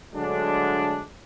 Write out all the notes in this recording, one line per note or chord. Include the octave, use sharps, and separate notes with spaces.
D3 F#3 G#3 A3 D4